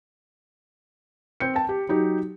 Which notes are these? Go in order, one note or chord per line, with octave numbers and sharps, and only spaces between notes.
C4 G6 C#7
G5 A5
G4
F#3 D#4 G4